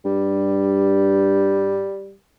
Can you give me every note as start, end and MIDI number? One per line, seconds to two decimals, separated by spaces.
0.05 1.89 43
0.05 2.15 55